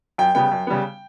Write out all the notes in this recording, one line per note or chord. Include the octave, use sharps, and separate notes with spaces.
F#2 G5
C#3 G3 B3 G5
F#2
C#3 G3 B3